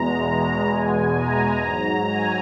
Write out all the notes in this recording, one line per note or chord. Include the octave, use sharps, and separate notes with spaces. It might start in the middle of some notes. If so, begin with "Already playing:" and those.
Already playing: E2 B2 G#3 A#5
A#5
E2 B2 G#3 G#5
A#5
G#2 F#3 A#5
G#5